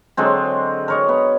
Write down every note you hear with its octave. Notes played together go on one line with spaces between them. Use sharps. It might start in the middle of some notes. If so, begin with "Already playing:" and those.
D3 F#3 G#3 C4
A#4 C#5 D#5
B3